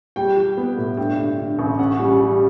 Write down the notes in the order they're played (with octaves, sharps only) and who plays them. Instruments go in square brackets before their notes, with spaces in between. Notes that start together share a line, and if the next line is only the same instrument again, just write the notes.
[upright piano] G3 G5
G3
B3
A2
G2 G5
D3
D3
A1
C#4 F#5
G3
G3